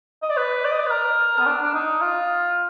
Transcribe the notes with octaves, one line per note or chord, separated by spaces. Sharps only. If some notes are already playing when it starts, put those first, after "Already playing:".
D#5
D5
B4
D5
D#5
D5
B4
A#4
B3
D4
D4
D#4
F4